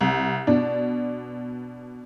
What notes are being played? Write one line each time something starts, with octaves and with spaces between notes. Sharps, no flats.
C2
B2 D4